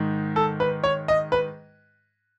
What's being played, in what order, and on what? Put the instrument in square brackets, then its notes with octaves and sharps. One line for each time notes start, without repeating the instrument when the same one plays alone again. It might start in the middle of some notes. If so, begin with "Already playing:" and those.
Already playing: [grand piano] G#2 D#3
A4
B4
C#5
D#5
B4